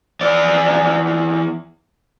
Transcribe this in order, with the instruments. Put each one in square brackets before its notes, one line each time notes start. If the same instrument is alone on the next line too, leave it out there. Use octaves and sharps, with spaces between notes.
[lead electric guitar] E2 D5